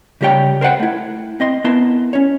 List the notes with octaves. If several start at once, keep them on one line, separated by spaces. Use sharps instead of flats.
C#3 G3 G4 C#5 G5
A#4 C5 D5 F#5 G5
A3 E4
C4 D#5 C6
B3 E4 A#4 A5 C6
C#4 C#5